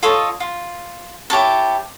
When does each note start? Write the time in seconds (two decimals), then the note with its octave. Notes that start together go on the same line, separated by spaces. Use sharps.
0.03 F4 A4 C#5 D#5
0.40 F4
1.30 E4 G4 C#5 A5